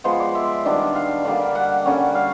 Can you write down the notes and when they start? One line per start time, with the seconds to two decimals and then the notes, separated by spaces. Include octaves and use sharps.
0.04 F3 G#3 B3 C5
0.20 D5
0.35 E5
0.66 D#3 G3 B3 D4
0.95 F5
1.25 D3 G3 A#3
1.55 F#5
1.86 D3 G3 A#3 C#4
2.15 F5